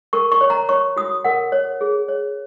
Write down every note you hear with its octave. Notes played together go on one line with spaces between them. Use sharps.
A#4 C#6
C#6
C#5
A#5
C#5 C#6
F#4 D#6
A#4 F#5
C#5
G#4
C#5